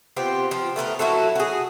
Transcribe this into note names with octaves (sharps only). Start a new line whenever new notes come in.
B3 C4 F4 G4
F3
A3 B3 A4 A#4
F#3 E4 F#4 A4
F#4 G#4